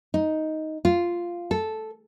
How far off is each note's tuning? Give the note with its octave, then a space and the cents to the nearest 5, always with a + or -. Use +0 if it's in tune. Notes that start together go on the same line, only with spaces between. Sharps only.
D#4 +5
F4 -5
A4 -5